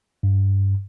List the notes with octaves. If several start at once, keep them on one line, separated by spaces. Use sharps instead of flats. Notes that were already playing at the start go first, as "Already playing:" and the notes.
G2